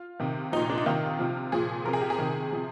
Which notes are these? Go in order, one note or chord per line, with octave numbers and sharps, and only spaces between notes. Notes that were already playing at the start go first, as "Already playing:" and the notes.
Already playing: F4
C3 D#3
A#2 F3 D#4
D4
D#4
C3 D#3 F4
C3 F3
A#2 F3 G#4
C3 F3 A#4
G#4
G4
G#4
C3 D#3
C3 F3